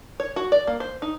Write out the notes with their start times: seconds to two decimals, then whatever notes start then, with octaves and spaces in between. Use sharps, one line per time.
0.20 C#5
0.36 F#4
0.52 D5
0.67 A#3
0.80 C5
1.02 D#4